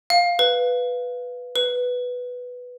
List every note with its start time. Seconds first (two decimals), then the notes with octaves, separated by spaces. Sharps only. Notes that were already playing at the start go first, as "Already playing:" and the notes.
0.10 F5
0.39 B4
1.56 B4